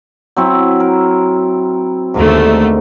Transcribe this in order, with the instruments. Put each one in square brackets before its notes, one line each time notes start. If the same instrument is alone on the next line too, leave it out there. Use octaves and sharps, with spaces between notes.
[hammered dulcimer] F#3 C4 E4
A#4
[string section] D#2 D3 A3 [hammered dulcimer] G#2 A#4 A#5